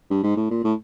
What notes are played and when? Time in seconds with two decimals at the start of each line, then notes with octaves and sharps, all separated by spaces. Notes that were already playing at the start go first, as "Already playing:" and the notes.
0.10 G2
0.24 G#2
0.36 A2
0.51 A#2
0.64 A2